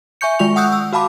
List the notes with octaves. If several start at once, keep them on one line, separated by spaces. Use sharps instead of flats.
E5 G#5 C#6 G6 C#7
D#3 G#3 F4 C#6 F7
F#5 C#6 D#6 E6 F#6 G6
E6
F#4 F5 A5 B5 D6